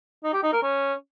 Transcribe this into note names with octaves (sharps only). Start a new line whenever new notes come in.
D#4
G4
D#4
A#4
C#4